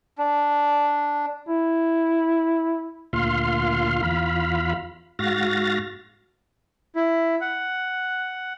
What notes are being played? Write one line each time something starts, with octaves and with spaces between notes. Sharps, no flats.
D4
E4
D2 A#2 F4 F5 C6
E2 F4 F5 B5
G#2 F#4 F5 A6 A#6
E4
F#5